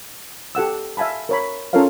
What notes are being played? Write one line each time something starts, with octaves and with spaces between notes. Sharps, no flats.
G4 A4 F#5 E6
E5 F5 G#5 A5 B5
A#4 C#5 B5
C#4 F4 A4 A#4 C#5 F5